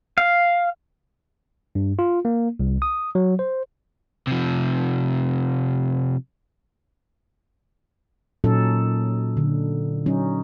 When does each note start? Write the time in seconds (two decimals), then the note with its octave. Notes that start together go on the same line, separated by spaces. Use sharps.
0.18 F5
1.75 G2
1.99 F4
2.25 A#3
2.60 C2
2.82 D#6
3.15 F#3
3.39 C5
4.27 C3 F3
8.44 A#2 F#3 C#4 D#4 A4
9.37 D3
10.06 F#3 C#4 D#4